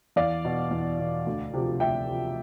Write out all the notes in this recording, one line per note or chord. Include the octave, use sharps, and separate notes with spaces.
E2 D5 F5
B2
E2
B2
D2
C3 F3
D2 E5 G5
C3 F3